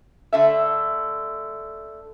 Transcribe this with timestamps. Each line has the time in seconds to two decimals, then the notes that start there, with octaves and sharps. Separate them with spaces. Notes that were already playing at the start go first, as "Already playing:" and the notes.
0.33 D3 A3 E5